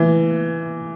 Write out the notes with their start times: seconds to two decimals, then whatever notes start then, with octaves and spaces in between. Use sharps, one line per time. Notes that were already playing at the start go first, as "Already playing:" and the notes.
Already playing: E3